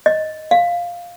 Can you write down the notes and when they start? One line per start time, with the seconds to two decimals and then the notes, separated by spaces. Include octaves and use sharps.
0.06 D#5
0.51 F5